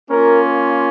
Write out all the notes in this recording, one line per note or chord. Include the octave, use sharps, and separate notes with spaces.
A#3 C#4 F4 A#4